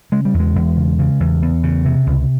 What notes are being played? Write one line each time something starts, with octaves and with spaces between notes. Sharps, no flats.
C#3 G#3
G3
E2 G#3
E2
C#3
C#3
E2
E2
C#3
C3
C#2